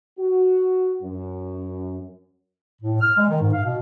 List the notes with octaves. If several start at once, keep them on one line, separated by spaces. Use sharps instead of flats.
F#4
F#2
A2
F6
G#3
D#3
G#2
F5
B2